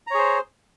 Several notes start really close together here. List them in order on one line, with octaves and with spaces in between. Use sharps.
A#5 C#5 G#4 C5